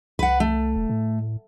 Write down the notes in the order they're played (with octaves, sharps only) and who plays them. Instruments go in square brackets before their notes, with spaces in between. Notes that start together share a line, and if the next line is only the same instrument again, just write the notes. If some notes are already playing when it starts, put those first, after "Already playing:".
[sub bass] C2 [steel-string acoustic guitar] B4 F#5
[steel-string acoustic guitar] A3
[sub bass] F1
A2